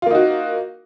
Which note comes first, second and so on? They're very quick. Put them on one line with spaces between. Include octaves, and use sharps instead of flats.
F4 A#3 D#4 F#4